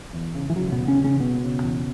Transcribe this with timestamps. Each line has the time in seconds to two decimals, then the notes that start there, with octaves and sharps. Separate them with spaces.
0.13 E2
0.35 C#3
0.50 E3
0.56 C#3 F#3
0.72 B2 B3
0.77 E2
0.88 C#3 C#4
0.99 E1
1.04 C#3 C#4
1.20 E1 B2 B3
1.42 C#3
1.63 E2